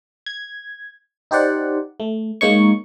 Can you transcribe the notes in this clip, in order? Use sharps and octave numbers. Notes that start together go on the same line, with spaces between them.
G#6
D#4 G4 C5 D5 F#5
A3
G#3 A#3 D#4 C#5 C#6